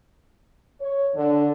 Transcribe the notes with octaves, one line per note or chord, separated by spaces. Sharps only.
C#5
D3